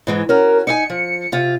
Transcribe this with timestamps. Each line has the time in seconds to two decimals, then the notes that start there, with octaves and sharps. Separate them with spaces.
0.07 G#2 E3 G#3
0.29 C#4 F#4 A#4
0.67 D#4 D#5 G#5 C#7
0.90 F3
1.32 C3 F4